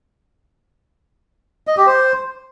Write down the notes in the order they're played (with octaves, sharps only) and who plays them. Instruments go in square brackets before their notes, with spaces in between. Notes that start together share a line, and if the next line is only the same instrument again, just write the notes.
[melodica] D#5
G4
C5